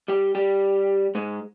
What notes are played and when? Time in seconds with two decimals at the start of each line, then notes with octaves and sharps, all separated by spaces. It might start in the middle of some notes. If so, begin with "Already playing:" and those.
0.08 G3 G4
0.35 G3 G4
1.15 G#2 G#3